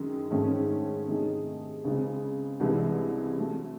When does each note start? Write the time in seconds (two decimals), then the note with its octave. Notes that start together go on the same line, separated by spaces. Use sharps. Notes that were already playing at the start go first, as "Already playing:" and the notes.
Already playing: F#2 D#3 G#3
0.31 G#2 D#3 A3 C#4
1.07 C3 D#3 A3 D#4 G#4
1.84 C#2 C#3 G#3 C4
2.60 C2 C3 E3 G#3
3.37 C3 F#3 A3